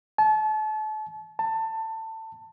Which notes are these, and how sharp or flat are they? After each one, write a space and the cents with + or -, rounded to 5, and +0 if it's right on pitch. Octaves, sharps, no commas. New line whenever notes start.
A5 -35
A5 +20